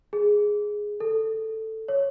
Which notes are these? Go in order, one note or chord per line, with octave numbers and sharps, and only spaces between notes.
G#4
A4
C#5